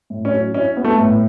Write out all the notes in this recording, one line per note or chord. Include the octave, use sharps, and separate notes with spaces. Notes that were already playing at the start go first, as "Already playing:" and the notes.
A2
C#4
F#3
C#4 E4
B3
A3
A2